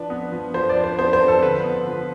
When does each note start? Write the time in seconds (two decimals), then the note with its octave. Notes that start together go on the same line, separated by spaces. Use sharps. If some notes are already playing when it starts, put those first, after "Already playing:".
Already playing: F3 D4 B4
0.10 B3
0.32 F3
0.54 F3 C5
0.69 D5
0.76 D4
0.84 C5
0.98 B3 C5
1.13 C5
1.21 F3
1.28 A4
1.42 D3 B4
1.64 B3
1.86 F3